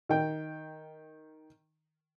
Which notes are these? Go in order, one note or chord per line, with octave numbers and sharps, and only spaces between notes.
D#3 G5